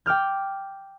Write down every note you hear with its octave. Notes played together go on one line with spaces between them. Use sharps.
G5 D6 F6 G6